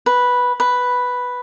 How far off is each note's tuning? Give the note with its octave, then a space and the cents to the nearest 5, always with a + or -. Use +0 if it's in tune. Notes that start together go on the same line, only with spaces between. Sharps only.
B4 -5
B4 +0